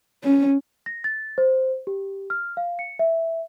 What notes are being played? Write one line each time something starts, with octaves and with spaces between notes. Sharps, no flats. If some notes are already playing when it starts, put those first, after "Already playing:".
C#4
A#6
A6
C5
G4
F6
F5
C#7
E5